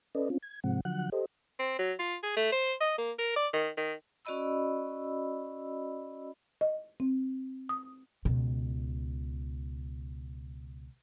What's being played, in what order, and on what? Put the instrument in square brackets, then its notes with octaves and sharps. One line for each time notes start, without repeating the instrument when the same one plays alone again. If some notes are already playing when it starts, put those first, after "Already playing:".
[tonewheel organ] C#4 A4 B4 D5 D#5
C4 C#4 F4
G#6
G#2 C3 F3 G#3 C4 F#5
D3 F3 F#3 F#5 F#6
G4 A4 C5 D#5
[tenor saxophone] C4
F#3
F4
G#4
A3
C5
D#5
A#3
A#4
D5
D#3
D#3
[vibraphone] C#4 F#4 D5 D#5 B5 E6
[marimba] D#5
C4
D#6
[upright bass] C#2 B2